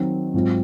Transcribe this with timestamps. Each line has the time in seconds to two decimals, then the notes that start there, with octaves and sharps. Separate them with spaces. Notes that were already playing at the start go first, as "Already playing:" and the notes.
Already playing: D#3 F#3 C4
0.34 G#2 F#3 C4 F4